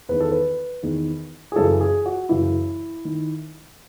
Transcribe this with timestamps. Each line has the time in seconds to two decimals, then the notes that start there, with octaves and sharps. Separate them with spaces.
0.09 E2 D#3 B4
0.20 A4
0.32 B4
0.83 E2 D#3
1.52 G#4
1.55 F#2 C#3 E3 A4
1.81 G#4
2.06 F#4
2.29 F#2 C#3 E3 E4
3.05 D#3